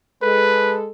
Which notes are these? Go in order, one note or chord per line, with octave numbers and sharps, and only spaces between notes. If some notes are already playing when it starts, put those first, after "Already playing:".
G#3 A4 B4